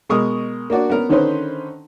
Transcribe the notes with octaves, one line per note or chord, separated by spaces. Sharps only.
B2 G#3 A#4 C#6 D#6
A#3 D4 F#4 D5
B3 C#4 A#4
D3 D#3 C#4 D#4 B4 C5